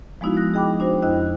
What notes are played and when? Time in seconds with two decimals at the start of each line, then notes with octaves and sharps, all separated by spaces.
0.21 F3 G#3 B3 D#4 E4 F#4
0.37 D#6 F#6 A#6
0.54 G#4 D#5 G5 B5 D6
0.79 D4 D#4 F#4 C5
1.02 F2 D4 E4 D#5 G5 F#6